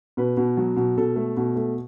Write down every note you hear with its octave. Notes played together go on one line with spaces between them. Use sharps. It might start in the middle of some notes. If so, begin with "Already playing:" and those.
B2 B4
B2
F#3
B2
B2 A4
A3
B2
A3